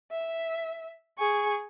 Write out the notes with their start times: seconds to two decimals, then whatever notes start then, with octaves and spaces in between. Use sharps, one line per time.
0.12 E5
1.18 G#4 C#6